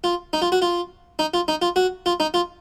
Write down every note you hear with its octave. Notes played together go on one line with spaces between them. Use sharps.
F4
D#4
F4
F#4
F4
D#4
F4
D#4
F4
F#4
F4
D#4
F4